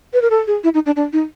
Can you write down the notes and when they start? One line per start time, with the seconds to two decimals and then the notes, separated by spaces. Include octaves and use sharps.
0.13 B4
0.22 A#4
0.30 A4
0.47 G#4
0.64 E4
0.74 D#4
0.86 D4
0.96 D4
1.13 D#4